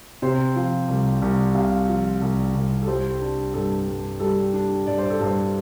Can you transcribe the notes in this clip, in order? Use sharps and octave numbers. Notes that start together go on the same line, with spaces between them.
C3 C5
F3
C2
C2
C3 F5
F3
C2
C2
A4
G3 C5
D4
G2 A4
G2
G3 A4
D4
G2 D5
C5
A4
G2 C5